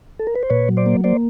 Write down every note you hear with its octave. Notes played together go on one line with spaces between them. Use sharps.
A4
A#4
B4
C5
A#2 B4 C#5
F#3
C5 D5
A#3
A#3 C5 D5